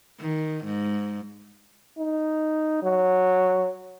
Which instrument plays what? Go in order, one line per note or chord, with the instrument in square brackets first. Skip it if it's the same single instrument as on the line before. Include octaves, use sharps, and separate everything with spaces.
[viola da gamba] D#3
G#2
[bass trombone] D#4
F#3